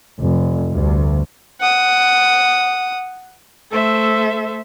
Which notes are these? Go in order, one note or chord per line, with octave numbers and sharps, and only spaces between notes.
F1
D2 G2
F#5 D#6
A3 A4 C5 E5